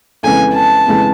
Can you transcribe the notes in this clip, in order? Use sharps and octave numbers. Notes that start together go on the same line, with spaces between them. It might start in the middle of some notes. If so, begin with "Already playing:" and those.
F2 C#3 E3 G#3 B3 G#5
A5
F2 C#3 E3 G#3 B3